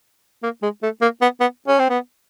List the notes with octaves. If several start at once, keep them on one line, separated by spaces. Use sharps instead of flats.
A#3
G#3
A3
A#3
B3
B3
C#4
C4
B3